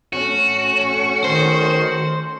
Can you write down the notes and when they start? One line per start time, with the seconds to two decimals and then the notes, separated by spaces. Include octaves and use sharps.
0.13 A3 C#4 F#4
1.24 D#3 C5